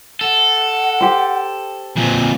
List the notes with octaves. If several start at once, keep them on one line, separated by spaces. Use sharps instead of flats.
A4 F#5
G4 C5
F2 A#2 G#5